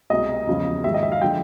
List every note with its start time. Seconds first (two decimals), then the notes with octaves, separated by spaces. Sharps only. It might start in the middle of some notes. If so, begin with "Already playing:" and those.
0.10 C2 B2 G#3 D#5
0.47 E2 C#3 F3 G#3
0.84 G#2 D#3 G3 E5
0.94 D#5
1.03 E5
1.12 F5
1.22 D3 F3 G#3 G5